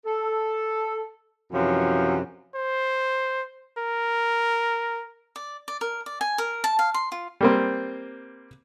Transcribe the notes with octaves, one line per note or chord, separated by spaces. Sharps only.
A4
F#2 C3 E3 F3 C#5
C5
A#4
D5
D5
A#4
D5
G#5
A#4
A5
F5
C6
F4
G3 A#3 C4